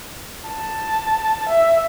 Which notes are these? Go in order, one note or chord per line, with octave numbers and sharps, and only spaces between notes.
A5
E5